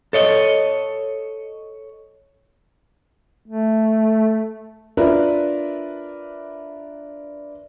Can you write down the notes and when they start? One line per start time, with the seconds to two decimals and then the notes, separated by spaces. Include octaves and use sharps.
0.13 A4 C#5 D#5
3.46 A3
4.97 D4 F4 A#4 B4 E5